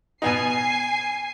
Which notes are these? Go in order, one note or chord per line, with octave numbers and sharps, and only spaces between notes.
B2 B3 D#4 G#5 C7